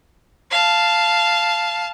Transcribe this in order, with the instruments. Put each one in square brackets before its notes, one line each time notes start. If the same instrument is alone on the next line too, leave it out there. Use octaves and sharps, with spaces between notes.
[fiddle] F5 A5